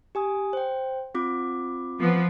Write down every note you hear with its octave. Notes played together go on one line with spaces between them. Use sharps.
G4 G#5 D#6
C5 G5
C4 F4 D6
F3 B3